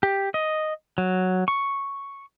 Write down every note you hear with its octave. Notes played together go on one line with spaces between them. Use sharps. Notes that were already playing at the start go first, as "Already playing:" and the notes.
G4
D#5
F#3
C#6